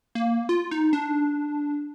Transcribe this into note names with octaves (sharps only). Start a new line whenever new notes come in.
A#3
F4
D#4
D4